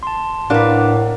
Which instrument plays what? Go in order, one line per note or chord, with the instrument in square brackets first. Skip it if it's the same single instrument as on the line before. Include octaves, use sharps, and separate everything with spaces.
[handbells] A5 C6
[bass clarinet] A2 [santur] A#3 F5 F#5 [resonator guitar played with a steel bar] D4 B4 [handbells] D5 D6